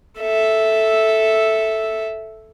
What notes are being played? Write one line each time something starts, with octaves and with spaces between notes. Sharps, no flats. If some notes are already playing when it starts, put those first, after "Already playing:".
A4 E5